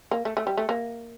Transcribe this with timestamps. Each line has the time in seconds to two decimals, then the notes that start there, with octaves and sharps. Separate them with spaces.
0.11 A#3
0.25 A3
0.37 A3
0.47 G3
0.58 A3
0.69 A#3